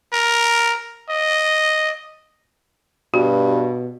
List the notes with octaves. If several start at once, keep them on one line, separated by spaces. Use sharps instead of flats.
A#4
D#5
G2 B2 F#4